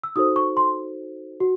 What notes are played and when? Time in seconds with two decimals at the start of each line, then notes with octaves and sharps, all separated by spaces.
0.04 E6
0.16 D#4 F#4 A4 C5 D#6
0.36 C#6
0.57 C6
1.40 F#4